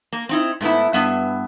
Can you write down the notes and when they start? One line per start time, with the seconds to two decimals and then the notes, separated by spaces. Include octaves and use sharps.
0.13 A#3
0.29 C4 D#4 E4
0.61 G#2 A3 B3 E4
0.93 G2 B3 E5